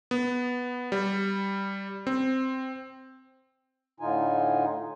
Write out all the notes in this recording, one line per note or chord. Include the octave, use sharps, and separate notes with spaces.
B3
G3
C4
A2 D3 D#4 F4 G#5